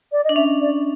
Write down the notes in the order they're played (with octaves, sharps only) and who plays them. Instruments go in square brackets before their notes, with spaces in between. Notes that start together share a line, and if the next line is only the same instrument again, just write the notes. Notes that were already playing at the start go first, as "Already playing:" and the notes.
[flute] D5
D#5
[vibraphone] D4
[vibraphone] C#4 [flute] E5
[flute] D5